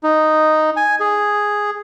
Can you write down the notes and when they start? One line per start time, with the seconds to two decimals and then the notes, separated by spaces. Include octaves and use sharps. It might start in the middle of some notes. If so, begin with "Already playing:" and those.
0.03 D#4
0.77 G#5
1.00 G#4